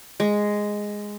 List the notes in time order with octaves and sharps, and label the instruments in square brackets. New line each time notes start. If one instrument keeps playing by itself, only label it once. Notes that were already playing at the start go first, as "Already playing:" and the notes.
[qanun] G#3